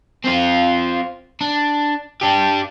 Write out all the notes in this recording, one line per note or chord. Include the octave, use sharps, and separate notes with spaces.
C4 F4
D4
D4 G4